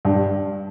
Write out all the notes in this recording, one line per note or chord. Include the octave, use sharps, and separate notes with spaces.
G2